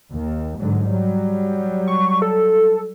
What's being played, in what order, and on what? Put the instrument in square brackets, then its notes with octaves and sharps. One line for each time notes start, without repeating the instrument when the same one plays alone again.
[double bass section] D#2
G#2 D3 F#3
F#3 G3
[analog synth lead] C#6
A4